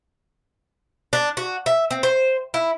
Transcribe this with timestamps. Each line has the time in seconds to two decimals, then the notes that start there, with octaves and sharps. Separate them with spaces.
1.13 D4
1.37 F#4
1.66 E5
1.91 C4
2.03 C5
2.54 E4